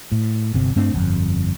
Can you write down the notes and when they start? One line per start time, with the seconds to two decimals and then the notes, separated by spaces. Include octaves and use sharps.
0.12 A2
0.54 G1 C3
0.76 G2 A3 C4 D4
0.94 G1 F2